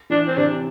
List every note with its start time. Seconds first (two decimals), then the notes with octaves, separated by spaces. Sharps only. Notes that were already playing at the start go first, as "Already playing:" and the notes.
0.10 E3 D4
0.27 C4
0.37 C3 D4